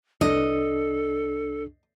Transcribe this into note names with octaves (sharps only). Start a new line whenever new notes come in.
C2 D4 A4 D#5